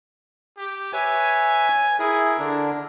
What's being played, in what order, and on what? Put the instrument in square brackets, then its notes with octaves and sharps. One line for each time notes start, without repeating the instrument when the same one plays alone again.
[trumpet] G4
[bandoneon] B4 C#5 E5 [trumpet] G#5
[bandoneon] E4 G#4 [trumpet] A#4
[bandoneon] D3 D4